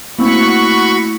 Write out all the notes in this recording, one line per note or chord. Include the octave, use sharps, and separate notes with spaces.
A3 A#3 C4 E4 F#4 B5 C#6 E6